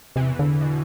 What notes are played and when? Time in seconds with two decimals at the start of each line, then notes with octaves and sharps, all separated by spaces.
0.16 E2 C3 E3
0.39 D3
0.61 B2